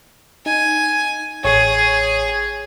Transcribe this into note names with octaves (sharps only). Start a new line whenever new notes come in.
D#4 G#5
A1 G#4 C#5 C#6